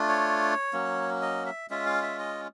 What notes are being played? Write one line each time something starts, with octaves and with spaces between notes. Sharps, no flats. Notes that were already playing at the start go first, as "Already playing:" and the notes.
Already playing: A3 D4 F4
C#5
F#3 A#3 C#4
D#5
E5
G#3 C#4 F4 E5
F5
E5
D#5